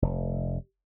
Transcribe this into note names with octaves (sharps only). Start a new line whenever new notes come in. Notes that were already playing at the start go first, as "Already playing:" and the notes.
F1